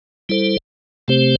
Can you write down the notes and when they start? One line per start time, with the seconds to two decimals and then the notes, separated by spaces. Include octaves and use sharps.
0.29 G3 E4 A4 C5
1.08 C3 A3 C4 G4 C5